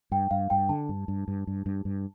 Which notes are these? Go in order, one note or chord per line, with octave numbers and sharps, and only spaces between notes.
G2 G5
G2 F5
G2 G5
D3 A5
G2
G2
G2
G2
G2
G2